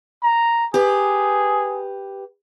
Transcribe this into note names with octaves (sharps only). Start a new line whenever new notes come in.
A#5
G4 G#4 B4